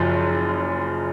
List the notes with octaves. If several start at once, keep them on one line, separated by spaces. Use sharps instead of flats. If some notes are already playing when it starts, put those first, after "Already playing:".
Already playing: F#1 F#2 F3